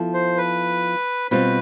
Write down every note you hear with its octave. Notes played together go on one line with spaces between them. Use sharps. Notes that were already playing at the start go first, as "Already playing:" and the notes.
Already playing: F3 B3 E4 A4
C5
B4
B2 G3 C4 F4 B4